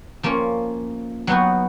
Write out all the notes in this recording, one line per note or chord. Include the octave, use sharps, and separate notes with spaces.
F3 A#3 C#4
F#3 B3 D#4 F#4